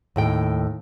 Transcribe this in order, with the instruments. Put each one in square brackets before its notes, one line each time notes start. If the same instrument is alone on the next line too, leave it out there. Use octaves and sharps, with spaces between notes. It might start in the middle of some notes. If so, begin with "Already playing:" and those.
[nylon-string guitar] D#2 A2 G5